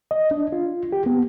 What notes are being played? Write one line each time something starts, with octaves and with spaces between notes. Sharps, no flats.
D#5
D4
F4
G4
B3